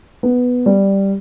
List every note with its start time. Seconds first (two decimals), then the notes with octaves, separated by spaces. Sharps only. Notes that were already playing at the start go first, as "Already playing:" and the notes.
0.23 B3
0.66 G3